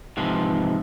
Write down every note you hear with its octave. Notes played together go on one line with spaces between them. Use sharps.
G#2 C3 E3 F3